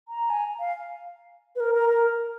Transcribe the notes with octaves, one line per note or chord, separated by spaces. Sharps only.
A#5
G#5
F5
B4
A#4
A#4
A#4